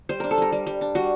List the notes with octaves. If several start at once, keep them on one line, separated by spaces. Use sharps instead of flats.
G3 C5
D4 A#4
A4
G3 A#4
G3
G3
D4
G3 F#4